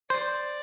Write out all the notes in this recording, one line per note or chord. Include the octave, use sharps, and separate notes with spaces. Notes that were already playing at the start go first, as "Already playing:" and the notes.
C5 D5